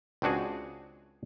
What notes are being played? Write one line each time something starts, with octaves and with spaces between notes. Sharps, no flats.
C#2 C4 D4 F#4 G#4